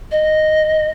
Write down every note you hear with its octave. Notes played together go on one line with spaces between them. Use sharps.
D#5